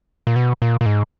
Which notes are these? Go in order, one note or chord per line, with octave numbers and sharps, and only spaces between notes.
A#2
B2
A#2
A#2
G#2